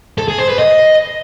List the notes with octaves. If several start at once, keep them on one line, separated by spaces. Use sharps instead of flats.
A4
G#4
C5
B4
D#5